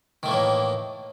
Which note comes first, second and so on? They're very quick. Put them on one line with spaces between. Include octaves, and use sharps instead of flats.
D#3 A3 E3 A#3 A2